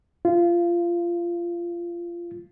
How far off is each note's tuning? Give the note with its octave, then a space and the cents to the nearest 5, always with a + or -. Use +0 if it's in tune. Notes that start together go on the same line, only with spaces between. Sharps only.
F4 -20